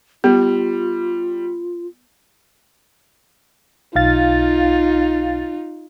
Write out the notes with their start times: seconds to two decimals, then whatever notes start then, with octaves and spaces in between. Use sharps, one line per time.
0.24 G3 B3 F4
3.96 B1 D#4 F4 F5 A6